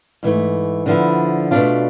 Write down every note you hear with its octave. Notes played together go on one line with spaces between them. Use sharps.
G#2 E3 A3
D3 F3 B3 E4
B2 A3 D4 F4